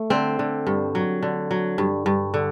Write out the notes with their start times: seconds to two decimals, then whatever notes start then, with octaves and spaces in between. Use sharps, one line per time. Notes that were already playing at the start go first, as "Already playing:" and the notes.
Already playing: A3
0.10 D3 C4
0.39 D3
0.67 G2
0.95 F#3
1.22 D3
1.51 F#3
1.78 G2
2.06 G2
2.34 D3